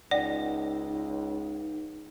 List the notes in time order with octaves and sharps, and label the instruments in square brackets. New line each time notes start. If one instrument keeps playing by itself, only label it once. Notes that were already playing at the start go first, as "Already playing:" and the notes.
[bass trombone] C#2 [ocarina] D#4 [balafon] D5 [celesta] F#5 G5